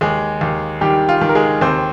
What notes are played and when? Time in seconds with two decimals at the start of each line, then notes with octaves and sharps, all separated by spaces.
0.01 D#2 G#3 G#4
0.41 D#2
0.81 D#3 G3 G4
1.09 F4
1.21 D#3
1.29 A#4
1.35 G#3 G#4
1.61 D#2 C4 C5